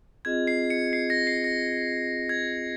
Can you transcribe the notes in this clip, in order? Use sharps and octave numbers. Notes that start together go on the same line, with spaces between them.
C4 F4 G#4 D#5 G#6
C7
C#7
C7
A#6
C7
A#6
G#6